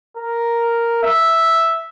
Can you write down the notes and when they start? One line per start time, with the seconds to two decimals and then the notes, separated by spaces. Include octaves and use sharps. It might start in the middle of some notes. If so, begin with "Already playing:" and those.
0.17 A#4
1.03 E5